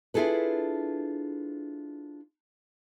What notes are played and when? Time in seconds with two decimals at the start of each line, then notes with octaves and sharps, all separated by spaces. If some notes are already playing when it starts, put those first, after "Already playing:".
0.14 D4 E4 F4 G#4 A4 B4